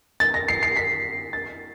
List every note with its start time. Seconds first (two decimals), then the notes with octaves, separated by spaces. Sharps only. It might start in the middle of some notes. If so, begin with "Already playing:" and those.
0.20 A6
0.34 A#6
0.48 C7
0.63 C7
0.77 B6
1.33 A6